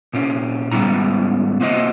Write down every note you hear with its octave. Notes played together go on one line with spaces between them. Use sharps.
A#2 C4 C#4
G#2 C#3 G3 B3 E4 A#5
A#3 C4 E4 F#4 C5 D#5